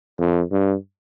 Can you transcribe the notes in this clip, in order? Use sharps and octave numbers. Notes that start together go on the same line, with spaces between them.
F2
G2